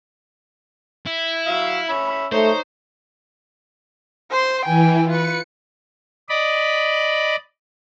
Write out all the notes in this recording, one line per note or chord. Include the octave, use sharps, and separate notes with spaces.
E4
F#3 E5 F5
C#4 E5 B5
A3 D#4 C5 C#5
C5 C6
E3 G5 G#5
F4 B4 C#7
D5 D#5 B5